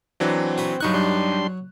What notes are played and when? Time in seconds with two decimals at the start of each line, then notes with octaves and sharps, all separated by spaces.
0.20 E3 F#3 C4 D4
0.58 F#4 B4
0.81 G2 F#3 D#4 C#6 F#6
0.94 G3 D4 C6